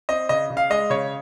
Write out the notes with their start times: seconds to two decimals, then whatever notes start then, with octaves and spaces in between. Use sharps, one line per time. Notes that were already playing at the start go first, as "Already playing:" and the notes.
0.09 C4 D#5
0.29 C#3 D#5
0.50 C#3
0.57 F5
0.70 G#3 D#5
0.90 C#3 C#5